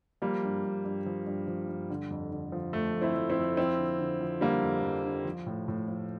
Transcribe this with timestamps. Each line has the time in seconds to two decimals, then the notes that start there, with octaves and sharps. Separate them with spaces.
0.22 F3 G3 A#3
0.43 G2
0.64 G2
0.85 G2
1.06 F3
1.27 G2
1.48 F3
1.69 G2
1.90 D3
2.10 F2
2.31 D3
2.52 F3
2.73 F2 A3
2.95 F2
3.02 C4 E4
3.16 F3
3.30 C4 E4
3.37 F2
3.57 F3 C4 E4
3.78 D3
4.00 D3
4.21 F3
4.41 D3 G3 A#3
4.63 F2
4.84 F2
5.04 D3
5.25 F3
5.46 A2
5.68 A2
5.88 F3